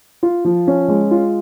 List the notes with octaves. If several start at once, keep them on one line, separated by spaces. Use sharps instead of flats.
F4
F3
C#4
G#3
F4